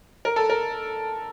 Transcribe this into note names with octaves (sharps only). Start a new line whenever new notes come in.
A#4
A4
A#4